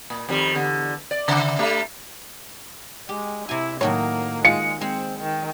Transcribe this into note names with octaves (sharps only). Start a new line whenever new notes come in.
A#2
F2 D#3 G3
E2 D3
D5
C#3
G3 A3
G#3 G4
C3 E4 G#5
A2 D#3 F#3 A#3 C#5
D#3 G#3 F4 C#7
G#3 C4 C5
D#3